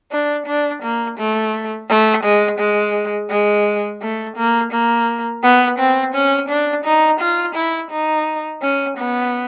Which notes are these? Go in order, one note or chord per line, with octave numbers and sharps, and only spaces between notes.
D4
D4
A#3
A3
A3
G#3
G#3
G#3
A3
A#3
A#3
B3
C4
C#4
D4
D#4
F4
E4
D#4
C#4
B3